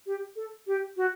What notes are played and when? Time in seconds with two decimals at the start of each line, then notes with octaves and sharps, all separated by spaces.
0.06 G4
0.36 A4
0.67 G4
0.97 F#4